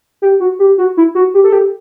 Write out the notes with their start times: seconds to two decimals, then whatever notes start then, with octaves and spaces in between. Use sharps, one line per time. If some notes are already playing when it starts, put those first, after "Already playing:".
0.22 G4
0.40 F#4
0.59 G4
0.78 F#4
0.97 E4
1.15 F#4
1.34 G4
1.44 A4
1.52 G4